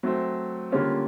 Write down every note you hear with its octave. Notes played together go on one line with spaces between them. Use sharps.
F#3 A3 C4
D3 G3 A#3 C#4 F4